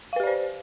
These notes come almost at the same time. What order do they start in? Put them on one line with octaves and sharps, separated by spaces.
F5 B4 G4 D5 C5